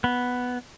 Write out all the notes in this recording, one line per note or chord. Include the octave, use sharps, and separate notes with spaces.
B3